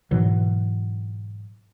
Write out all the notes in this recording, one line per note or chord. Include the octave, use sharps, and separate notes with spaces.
G#2 B2 E3 F#3